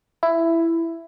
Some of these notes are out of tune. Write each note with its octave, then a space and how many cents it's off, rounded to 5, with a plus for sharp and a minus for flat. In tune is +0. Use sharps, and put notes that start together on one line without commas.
E4 +10